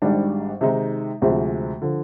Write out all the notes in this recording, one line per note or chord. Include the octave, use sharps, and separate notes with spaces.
G#1 G#2 D#3 G3 D4
C3 D#3 G#3 D#4
D2 C3 F3 G#3
D3 F3